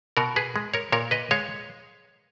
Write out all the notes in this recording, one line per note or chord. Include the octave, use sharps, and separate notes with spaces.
B2 F#4 A#4
G#4 B4
G#3
A#4 C#5
A#2 A#4 C#5
B4 D#5
G#3 C#5 F5